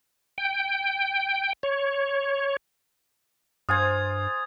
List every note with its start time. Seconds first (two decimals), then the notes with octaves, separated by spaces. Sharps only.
0.38 G5
1.63 C#5
3.69 G2 F4 C5 G#5 D#6 G#6